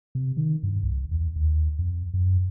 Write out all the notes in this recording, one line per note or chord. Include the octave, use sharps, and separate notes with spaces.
C3
D#3
G2
C2
E2
D#2
F2
F#2